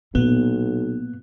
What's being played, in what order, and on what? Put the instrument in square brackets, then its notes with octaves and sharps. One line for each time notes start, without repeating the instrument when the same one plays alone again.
[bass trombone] B1 [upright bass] A#2 [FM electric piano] B3